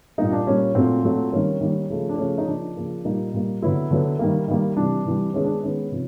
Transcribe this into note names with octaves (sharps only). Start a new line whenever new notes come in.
A#2 G3 A#3 D#4
D4
A#2 G3 A#3 C#4
A#2 F#3 A3 C4
A#2 F#3 A3
D#3 G3 A#3 C#4
D#3 G3 A#3
C#3 F3 A3
D4
C#3 F3 A3 C#4
D#4
C#3 F3 A#3 D4
C#3 F3 A#3
A#2 G3 A#3 D#4
A#2 G3 A#3
D3 F#3 B3 E4
D3 F#3 B3
D#3 G3 A#3
D#3 G3 A#3
C3 E3 G3 D4
C3 E3 G3
D#3 G#3 B3 C#4
D4
D#3 G#3 B3 C#4
C3 F3